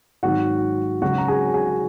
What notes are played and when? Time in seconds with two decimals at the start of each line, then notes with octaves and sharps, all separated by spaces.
0.23 G#1 G#2 D#3 F#3 F#4 F#5
1.02 C#2 C#3 F#3 F#4 F#5
1.18 A#5
1.28 G#4 G#5
1.54 G#4 G#5